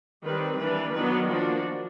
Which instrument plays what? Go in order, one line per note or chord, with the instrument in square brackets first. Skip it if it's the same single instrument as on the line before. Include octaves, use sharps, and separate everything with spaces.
[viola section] D#3 G3 C4 B4
E3 G3 A#3 D4 B4
D#3 F#3 B3 D4 B4
F3 A#3 D4 F#4